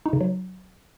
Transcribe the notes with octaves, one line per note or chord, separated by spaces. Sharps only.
D#4
C#3
F#3